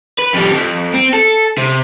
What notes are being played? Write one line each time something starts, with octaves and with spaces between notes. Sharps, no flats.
B4
F2 G3
F2
C4
A4
C3